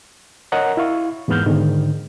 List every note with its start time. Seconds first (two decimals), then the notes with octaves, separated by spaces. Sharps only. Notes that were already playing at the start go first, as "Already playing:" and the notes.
0.52 A#4 C#5 D#5 F#5 A#5
0.77 E4 F5 C#6
1.28 E2 G#2 A#3 B3 F6 G6
1.46 G#2 D3 D#3 G#3